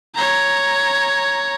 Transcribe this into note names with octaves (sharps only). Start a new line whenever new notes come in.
C#5 A#5